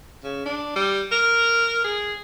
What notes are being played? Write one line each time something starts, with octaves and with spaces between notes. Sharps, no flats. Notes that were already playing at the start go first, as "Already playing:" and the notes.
C#3
D4
G3
A#4
G#4